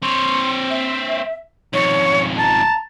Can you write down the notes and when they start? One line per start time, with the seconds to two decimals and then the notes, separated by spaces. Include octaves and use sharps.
0.03 C4 C#5 C6
0.70 E5
1.74 F2 G#2 C#5
2.39 A5 A#5